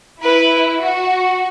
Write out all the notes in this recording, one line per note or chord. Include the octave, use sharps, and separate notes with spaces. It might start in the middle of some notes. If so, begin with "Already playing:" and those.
E4 B4
F#4